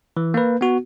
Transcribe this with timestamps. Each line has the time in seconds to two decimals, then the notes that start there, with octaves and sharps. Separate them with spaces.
0.17 E3
0.34 A#3 B4
0.61 B3 F#4